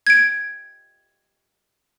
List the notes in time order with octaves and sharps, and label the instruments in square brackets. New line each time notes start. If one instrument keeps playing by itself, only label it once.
[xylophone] G#6 D7